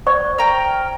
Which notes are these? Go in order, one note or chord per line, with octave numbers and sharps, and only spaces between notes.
C5 D5 C#6
G5 A#5 F6